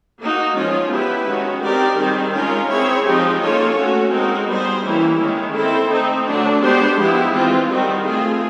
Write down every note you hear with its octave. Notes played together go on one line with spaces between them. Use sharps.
A#3 D#4 F#4
F3 G#3 C#4 F4 G#4
B3 E4 G4 B4
D#3 G#3 C#4 F#4
C4 D#4 G4 A#4 D5
D#3 G3 C4 D#4 G#4
G#3 C#4 F4 A#4
C4 E4 G#4 C#5
F3 G#3 C4 D#4 G4
A#3 C#4 F4 A4 C#5
A3 C#4 F#4
G#3 C4 D#4 F#4 A#4
G3 B3 D#4 G#4 C5
E3 G3 A#3 C#4 E4
D#3 G#3 C#4
C4 E4 A4
A3 C4 D#4
D3 F#3 A3 D4
G#3 B3 D4 G4 C5
F3 G#3 B3 E4 G4
E3 G#3 C4 F4
D#3 G3 C4 D#4 F#4
A3 C4 F4 G#4